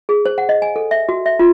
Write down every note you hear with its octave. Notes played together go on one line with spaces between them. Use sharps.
G#4
C5
F#5
D#5
G#5
A4
E5
F#4
E5
F4